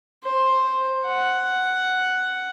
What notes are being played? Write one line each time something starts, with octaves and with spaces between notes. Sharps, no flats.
C5
F#5